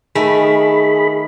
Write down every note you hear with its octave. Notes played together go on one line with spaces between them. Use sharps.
D#3 A3 G#4 B5